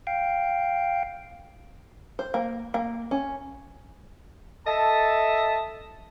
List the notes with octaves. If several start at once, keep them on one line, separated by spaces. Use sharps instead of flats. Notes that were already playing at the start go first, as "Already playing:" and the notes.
F5 G5
C5
A#3
A#3
C#4
A4 D#5 E5 A5